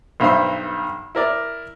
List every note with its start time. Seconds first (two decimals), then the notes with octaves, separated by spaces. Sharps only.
0.20 B1 G2 C5 E5 C6
1.15 E4 A#4 D5